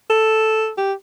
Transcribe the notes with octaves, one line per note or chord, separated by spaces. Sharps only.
A4
G4